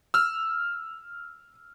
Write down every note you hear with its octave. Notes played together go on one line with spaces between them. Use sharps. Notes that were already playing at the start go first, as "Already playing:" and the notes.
E6 F6